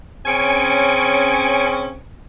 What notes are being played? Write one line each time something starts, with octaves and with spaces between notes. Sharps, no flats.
C#3 C4 C#4 G#5 C#7 D7